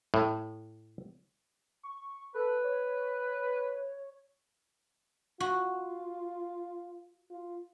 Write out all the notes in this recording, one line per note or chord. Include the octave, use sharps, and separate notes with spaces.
A2
C#6
A4 B4
C#5
F4 F#4
F4